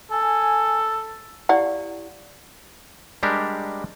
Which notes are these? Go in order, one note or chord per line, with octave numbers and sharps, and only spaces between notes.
A4 G#5
E4 G4 D5 F5 F#5
G3 G#3 D4 G4 A#4